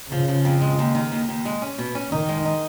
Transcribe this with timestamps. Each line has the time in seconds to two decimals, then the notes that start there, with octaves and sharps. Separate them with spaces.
0.11 C#3 F3
0.28 F3
0.45 F2
0.61 G#3
0.79 D#2
0.95 D#3
1.12 D#2
1.29 D#2
1.45 G#3
1.62 C#4
1.78 B2
1.95 C#4
2.12 D#3 D#4
2.29 G#3
2.45 D#4